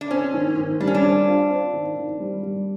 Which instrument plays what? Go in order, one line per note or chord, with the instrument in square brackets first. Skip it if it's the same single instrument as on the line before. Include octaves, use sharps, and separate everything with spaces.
[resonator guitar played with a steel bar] D4
[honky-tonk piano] C4 [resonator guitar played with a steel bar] C#4
[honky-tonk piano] D#3
D#3
[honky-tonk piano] G3 [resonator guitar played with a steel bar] D4
[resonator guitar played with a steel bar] C#4
D4
[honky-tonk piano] C4
F4
C4
D#3
D#3
G3
G3